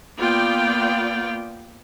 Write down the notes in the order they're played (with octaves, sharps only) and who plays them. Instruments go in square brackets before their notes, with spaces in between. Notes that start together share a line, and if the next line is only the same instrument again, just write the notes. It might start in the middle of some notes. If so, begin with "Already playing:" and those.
[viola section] A#3 B3 F4 D5 G5